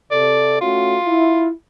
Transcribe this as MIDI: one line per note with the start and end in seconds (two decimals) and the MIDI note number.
0.11 0.61 48
0.11 0.61 69
0.11 0.57 74
0.61 0.97 57
0.61 0.97 61
0.61 1.50 65
0.61 0.97 66
1.07 1.50 64